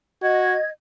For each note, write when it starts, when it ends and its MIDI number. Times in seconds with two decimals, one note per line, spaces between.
0.22 0.56 66
0.22 0.68 75
0.22 0.68 92